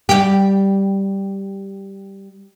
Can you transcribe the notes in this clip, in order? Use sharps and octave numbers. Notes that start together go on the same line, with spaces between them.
G3 G4